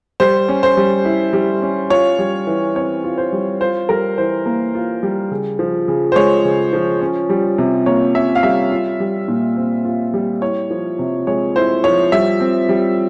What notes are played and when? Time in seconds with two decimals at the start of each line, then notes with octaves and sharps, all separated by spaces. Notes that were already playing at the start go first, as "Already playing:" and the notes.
0.20 G3 C5
0.48 C#4
0.63 C5
0.77 G3
1.05 E4
1.33 G3
1.62 C#4
1.90 F4 C#5
2.19 G3
2.47 E3
2.75 C4 C#5
3.04 F4
3.18 C5
3.33 G3
3.61 F4 C5
3.89 G3 A#4
4.18 E3 C5
4.46 A#3
4.75 F4
5.03 G3
5.31 C#3
5.59 F3
5.88 C#3
6.12 C5
6.16 G#3 C#5
6.45 C#3
6.73 F3
7.01 C#4
7.29 G3
7.58 C3
7.86 A#3 C#5
8.15 C#4 E5
8.35 F5
8.43 G3 E5
8.72 F4
9.00 G3
9.28 A#2
9.57 C4
9.85 F4
10.14 G3
10.42 E4 C#5
10.71 F3
10.99 C3
11.27 G#3 C#5
11.56 E4 C5
11.84 F3 C#5
12.12 G3 E5
12.40 C4
12.69 G3